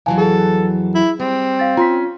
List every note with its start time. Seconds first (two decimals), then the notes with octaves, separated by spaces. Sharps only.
0.06 F2 E3 F#3 F5 G#5 A5
0.18 G#4 A4
0.95 E4
1.20 G3 C4
1.59 F5 A6
1.77 C#4 F4 C6 B6